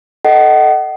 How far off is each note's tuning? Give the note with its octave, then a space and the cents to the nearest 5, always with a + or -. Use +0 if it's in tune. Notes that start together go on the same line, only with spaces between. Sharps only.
A4 +0 D#5 +0 F#5 +35